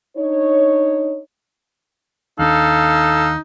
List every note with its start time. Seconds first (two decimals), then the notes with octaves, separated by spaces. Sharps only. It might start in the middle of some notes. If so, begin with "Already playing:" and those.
0.16 D4 D#4 C#5
2.39 D#2 D4 D#4 A4 F5